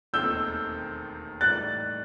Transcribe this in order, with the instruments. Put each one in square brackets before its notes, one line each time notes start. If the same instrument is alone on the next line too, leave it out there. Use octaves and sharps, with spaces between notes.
[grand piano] E1 D#2 D#3 A3 C4 [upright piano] E6 G6
[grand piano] A2 E3 G3 D#4 [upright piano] F#6 A6